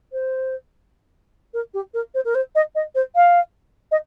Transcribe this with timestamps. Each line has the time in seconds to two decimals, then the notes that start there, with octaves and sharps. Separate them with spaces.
0.12 C5
1.53 A#4
1.74 G4
1.94 A#4
2.14 C5
2.25 A#4
2.34 C5
2.55 D#5
2.75 D#5
2.95 C5
3.15 F5
3.91 D#5